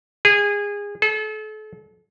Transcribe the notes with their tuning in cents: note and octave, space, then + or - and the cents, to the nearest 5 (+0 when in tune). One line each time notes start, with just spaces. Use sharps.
G#4 -25
A4 -40